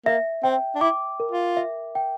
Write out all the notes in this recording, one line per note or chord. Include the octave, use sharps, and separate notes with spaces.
A#3 E5
C4 G5
D4
E4 D6
A#4
F4
E5
G5